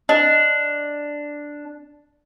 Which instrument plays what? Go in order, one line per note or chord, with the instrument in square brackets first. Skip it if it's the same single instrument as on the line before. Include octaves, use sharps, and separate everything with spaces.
[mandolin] D4 [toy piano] D#5